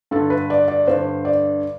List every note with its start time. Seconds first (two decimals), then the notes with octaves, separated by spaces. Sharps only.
0.11 G2 D3 A4
0.30 B4
0.50 D5
0.68 D5
0.88 G2 D3 C5
1.25 D5